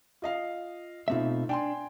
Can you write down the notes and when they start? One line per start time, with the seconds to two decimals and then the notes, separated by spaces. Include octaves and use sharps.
0.22 F4 D#5 F5
1.08 B2 A3 C4 D#4 F4 E5
1.49 D4 G5 G#5 C6